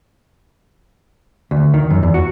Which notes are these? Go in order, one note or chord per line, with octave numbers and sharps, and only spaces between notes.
D2
D#3
F#2
E2
F#4